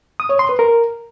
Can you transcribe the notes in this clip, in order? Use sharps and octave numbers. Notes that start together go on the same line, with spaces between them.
D#6
C#5
C6
B4
A#4